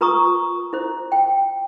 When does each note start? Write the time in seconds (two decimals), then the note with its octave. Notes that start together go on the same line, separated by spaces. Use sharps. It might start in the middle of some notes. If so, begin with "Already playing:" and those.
0.01 F4 B4 A#5 C#6 D#6
0.73 E4 C5
1.12 G5